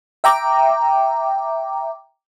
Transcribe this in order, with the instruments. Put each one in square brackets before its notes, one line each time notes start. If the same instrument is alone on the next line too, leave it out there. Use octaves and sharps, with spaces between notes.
[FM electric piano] E5 G5 A#5 D6